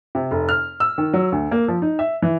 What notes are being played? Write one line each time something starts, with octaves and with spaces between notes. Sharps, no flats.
C3
F1
F6
E6
D#3
F#3
D2
A#3
F3
D#4
E5
E3